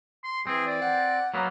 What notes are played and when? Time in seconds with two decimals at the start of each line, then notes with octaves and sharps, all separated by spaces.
0.24 C6
0.47 E3 C4 G#4
0.67 D5
0.82 F#5
1.34 F#3 A#3 B3